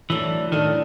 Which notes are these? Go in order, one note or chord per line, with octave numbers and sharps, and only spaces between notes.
A2 E3 F#3 A3 D4
A2 D#3 F#3 A3 D4